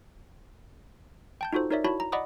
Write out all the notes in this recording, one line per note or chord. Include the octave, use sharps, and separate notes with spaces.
G5 A5 G6
D#4 F4 F#4 A4 C5
D#4 A#4 C#5 D5 E5
E4 F#4 C#5 A5 B5
A#5
D5 D#5 F#5 B5 D6 D#6